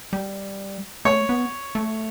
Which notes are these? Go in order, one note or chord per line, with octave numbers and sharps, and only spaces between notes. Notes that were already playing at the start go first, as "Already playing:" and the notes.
G3
A3 C#5
B3
A3